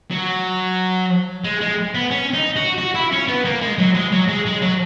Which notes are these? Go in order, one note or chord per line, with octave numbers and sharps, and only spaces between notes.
F#3
G#3
G#3
B3
C#4
D#4
F#4
F#4
E4
C#4
B3
A#3
G#3
F#3
G#3
F#3
G#3
G#3
F#3